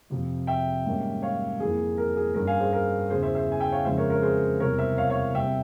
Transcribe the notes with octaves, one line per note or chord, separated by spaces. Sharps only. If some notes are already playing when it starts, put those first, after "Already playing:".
F2 C3 F3
E5 G5
G#2 G3 A#3 C#4
C#5 F5
F2 E3 A#3 G#4
A#4
G#4
G2 G3 C#4 A#4
F5 G#5
G#4 C5
A#4
E2 C#3 E3 G#4 C5
C5 E5
C5 E5
G#5
E5 G5
C#5 F5
F2 C#3 F3 G#3 C4 C5 E5
A#4 C#5
A#4 C#5
G#4 C5
E2 C3 G3 A#4 C#5
C5 E5
C#5 F5
C#5 F5
C3 G3 C4 E5 G5